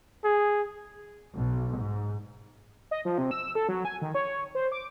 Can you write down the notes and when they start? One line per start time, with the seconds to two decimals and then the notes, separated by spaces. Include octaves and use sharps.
0.24 G#4
1.35 B1
1.77 G#2
2.91 D#5
3.05 F3
3.18 C3
3.31 E6
3.55 A4
3.69 F#3
3.85 G#5
4.02 D#3
4.14 C#5
4.55 C5
4.72 D6